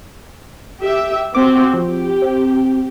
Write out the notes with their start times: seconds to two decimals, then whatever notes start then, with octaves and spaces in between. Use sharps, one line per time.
0.79 G4 E5
1.35 C4 F#4 D6
1.74 F3 G4
2.22 C4